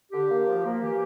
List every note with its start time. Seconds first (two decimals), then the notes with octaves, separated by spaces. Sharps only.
0.12 D3 G4
0.30 A#3
0.48 F3
0.65 A#3
0.82 E3 G4